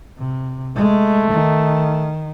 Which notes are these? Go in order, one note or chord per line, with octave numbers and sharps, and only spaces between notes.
C3
G#3 A3
D#3